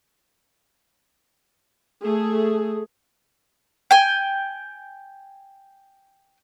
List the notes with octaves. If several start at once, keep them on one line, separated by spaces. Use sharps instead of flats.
A3 G#4
G5 G#5